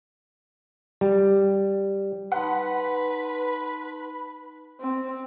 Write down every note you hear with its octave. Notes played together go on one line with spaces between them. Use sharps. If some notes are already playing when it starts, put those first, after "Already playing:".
G3
D#4 B4 F#5 A5 B5 C6
C4